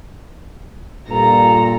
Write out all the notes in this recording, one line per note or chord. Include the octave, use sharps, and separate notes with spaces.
G2 A#2 A4 A#5